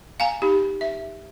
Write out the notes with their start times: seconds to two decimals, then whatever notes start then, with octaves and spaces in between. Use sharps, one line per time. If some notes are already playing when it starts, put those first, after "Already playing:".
0.20 F5 G#5 A#5
0.42 D#4 G4
0.81 E5